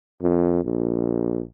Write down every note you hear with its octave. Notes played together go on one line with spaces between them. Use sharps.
F2
A#1